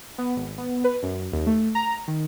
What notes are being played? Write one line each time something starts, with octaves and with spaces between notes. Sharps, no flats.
B3
G#1
B3
B4
F#2
D#2
A3
A#5
D#3